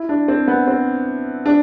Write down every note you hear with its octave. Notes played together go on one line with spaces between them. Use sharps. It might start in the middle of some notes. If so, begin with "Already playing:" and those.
Already playing: E4
D4
C4
B3
C4
D4